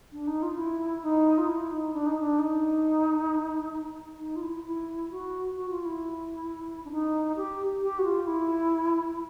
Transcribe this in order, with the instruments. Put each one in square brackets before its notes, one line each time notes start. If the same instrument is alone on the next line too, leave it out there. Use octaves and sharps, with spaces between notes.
[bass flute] D4
D#4
F4
E4
D#4
F4
E4
D#4
D4
D#4
D4
D#4
D#4
F4
E4
E4
F#4
F#4
F4
E4
D4
D#4
G4
G4
F#4
F4
E4